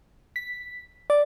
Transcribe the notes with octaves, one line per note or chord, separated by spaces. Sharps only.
B6
D5